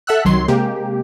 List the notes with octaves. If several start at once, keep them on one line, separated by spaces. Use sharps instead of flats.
A4 E5 F#5 E6 F#6
C2 D#3 F#3 C6
C3 G#3 A#3 G4